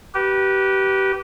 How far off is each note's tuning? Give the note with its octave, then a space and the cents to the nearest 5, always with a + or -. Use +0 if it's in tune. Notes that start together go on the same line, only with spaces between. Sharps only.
G4 -25 B4 -15